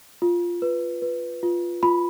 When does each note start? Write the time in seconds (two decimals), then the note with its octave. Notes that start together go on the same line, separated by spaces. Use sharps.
0.22 F4
0.62 B4
1.02 B4
1.43 F4
1.83 F4 B5